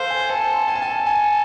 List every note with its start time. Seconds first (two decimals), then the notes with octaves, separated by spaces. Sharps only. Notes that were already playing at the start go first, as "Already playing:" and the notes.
Already playing: A4 C5 F5
0.10 G#5
0.29 A4 G#5
0.68 G#5
0.75 A5
0.82 G#5
1.06 G#5